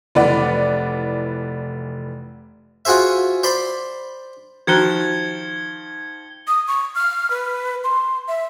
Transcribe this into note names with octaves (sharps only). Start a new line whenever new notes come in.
F1 E3 B4 D5 F#5
F4 F#4 G#4 C5 E5
C5 D5 B5 C6
D#3 F3 F#4 A#5 F#6 G#6 C#7 G7
D#6
C#6
F6
B4
C6
E5